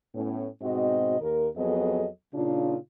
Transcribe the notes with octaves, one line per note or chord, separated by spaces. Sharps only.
A2 B3 C#4
G#2 B2 C4 F#4 D#5
D#2 A#4
F2 F#3 B3 G#4 A4 D#5
A#2 C#3 D4 D#4 F4